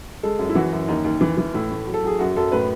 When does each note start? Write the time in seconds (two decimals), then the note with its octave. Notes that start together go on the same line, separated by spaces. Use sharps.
0.23 G#3 A4
0.39 F#2
0.49 E4
0.55 E3 F#4
0.72 F#2
0.88 D#2 D#4
1.04 D#2
1.21 E3
1.37 E3
1.54 A2 E4
1.71 A3
1.87 F#3
1.94 A4
2.04 F#3 G#4
2.19 F#2 F#4
2.36 F#2 A4
2.52 A2 B4